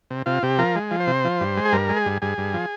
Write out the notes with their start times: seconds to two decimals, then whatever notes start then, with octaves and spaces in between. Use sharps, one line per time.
0.10 C3
0.26 C3 F4
0.43 C3 G4
0.58 F3 A#4
0.76 G#3
0.91 F3
1.00 C5
1.07 C3
1.25 F3
1.41 G2
1.57 G#3
1.65 G#4
1.73 G2 A#4
1.89 G#3
1.97 G#4
2.06 G2
2.22 G2 G#4
2.38 G2
2.54 F3